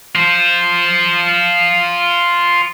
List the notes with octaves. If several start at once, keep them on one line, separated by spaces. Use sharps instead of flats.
F4 C5